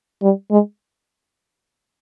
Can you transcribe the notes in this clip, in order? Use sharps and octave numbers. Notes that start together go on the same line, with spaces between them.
G3
G#3